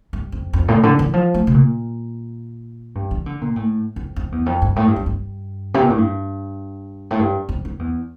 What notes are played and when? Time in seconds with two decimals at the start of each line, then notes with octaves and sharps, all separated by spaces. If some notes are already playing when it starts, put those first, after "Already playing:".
0.13 G2
0.32 F2
0.53 F2
0.68 A2
0.83 D3
0.99 E3
1.13 F3
1.34 A3
1.47 C3
1.54 A#2
2.95 G2
3.11 E3
3.26 D3
3.41 A#2
3.56 A2
3.96 F2
4.16 F2
4.32 E2
4.46 F2
4.62 G2
4.76 A2
4.87 G2
4.96 F2
5.06 G2
5.74 C3
5.82 A#2
5.90 A2
5.98 G2
7.11 A2
7.19 G2
7.49 F2
7.65 F2
7.79 E2